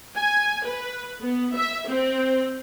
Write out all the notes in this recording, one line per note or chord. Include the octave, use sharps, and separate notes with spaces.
G#5
B4
B3
E5
C4